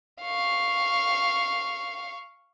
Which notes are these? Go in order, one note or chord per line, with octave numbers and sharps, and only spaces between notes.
F5 C#6